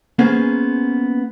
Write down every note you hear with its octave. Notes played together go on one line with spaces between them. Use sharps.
A#3 B3 C#4 G#4 C5